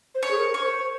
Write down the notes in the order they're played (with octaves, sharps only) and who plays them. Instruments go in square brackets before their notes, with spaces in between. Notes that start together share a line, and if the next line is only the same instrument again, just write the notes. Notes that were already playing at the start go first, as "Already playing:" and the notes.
[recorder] C5
[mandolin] C#5
[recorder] G#4
A#4
[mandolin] C#5
[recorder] C5